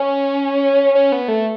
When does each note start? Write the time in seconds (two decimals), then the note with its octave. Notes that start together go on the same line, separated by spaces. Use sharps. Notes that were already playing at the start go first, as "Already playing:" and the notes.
Already playing: C#4
0.95 C#4
1.12 B3
1.28 A3